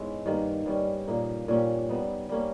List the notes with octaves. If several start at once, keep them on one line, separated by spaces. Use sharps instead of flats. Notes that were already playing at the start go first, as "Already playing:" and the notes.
Already playing: G#2 G#3 B3 C#4 E4
G2 D#3 A#3
G2 G3 C#4
A#2 A#3 D#4
A#2 A#3 C#4 G4
G3 B3 D#4
G3 A#3 C#4